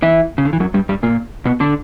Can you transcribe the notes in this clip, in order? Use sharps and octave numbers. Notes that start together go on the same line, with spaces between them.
E3 E4
C#3
D3
E3
F#2 F#3
G2 G3
G2 G3
A#2 A#3
B2 B3
D3 D4